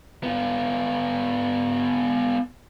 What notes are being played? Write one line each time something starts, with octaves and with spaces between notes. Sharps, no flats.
B3 F4